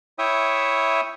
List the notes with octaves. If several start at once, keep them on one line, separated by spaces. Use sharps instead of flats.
E4 C#5 E5 G5 D#6